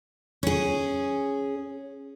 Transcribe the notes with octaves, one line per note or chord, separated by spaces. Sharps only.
C#4 G#4